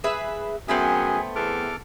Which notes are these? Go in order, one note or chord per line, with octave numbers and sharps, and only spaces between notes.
G#4 B4 E5
F#2 A3 B3 C4 G#4
E2 A4 D6 F6